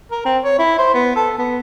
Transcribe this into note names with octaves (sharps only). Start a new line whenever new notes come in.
A#4
C4
C#5
E4
C5
B3
A4
B3